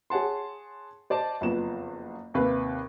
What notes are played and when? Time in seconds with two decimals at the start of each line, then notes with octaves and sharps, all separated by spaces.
0.10 G#4 C#5 F#5 A5 C6
1.10 C5 D5 D#5 A5
1.41 F#1 F2 B3 E7
2.34 D#2 C3 B4 F5